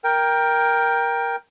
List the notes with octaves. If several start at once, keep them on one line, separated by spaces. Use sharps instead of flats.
A#4 G5